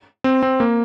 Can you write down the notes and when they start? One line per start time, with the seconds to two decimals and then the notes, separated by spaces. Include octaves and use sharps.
0.24 C4
0.42 C4
0.60 A#3